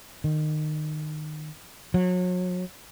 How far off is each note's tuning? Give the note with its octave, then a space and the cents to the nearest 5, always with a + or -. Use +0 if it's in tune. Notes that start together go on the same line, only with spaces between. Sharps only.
D#3 -25
F#3 -35